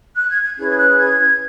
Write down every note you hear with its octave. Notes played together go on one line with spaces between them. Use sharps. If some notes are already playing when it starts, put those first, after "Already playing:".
F#6
G#6
G#6
C#4 E4 G#4 B4 G#6
G#6
F#6
G#6